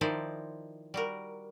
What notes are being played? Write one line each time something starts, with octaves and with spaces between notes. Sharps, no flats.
D#3 F3 D#4 E4 C5 D5
G3 F#4 A#4